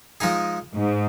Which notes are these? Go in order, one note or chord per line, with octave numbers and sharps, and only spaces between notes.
F3 G#3 D#4 G#4
G#2